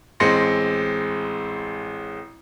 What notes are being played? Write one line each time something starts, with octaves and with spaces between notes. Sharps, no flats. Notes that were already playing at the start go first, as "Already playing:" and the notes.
A1 G#3 C4 C6 A#6 C#7